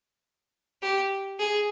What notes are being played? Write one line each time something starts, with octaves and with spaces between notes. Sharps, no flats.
G4
G#4